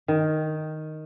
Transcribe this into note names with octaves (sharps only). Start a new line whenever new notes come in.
D#3